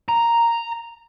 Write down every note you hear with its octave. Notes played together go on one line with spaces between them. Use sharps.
A#5